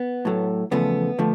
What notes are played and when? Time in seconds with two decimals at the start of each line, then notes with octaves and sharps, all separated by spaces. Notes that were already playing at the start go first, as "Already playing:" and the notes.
Already playing: B3
0.25 A2 F#3 A3
0.71 E2 C#3 F3 A3 B3
1.19 D3 F3 A3